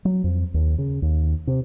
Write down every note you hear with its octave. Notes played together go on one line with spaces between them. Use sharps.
F#3
F2
D#2
C#3
D#2
C3